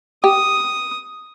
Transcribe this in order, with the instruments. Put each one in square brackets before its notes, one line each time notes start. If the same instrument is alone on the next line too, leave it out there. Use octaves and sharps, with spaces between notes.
[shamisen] G4 [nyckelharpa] D#6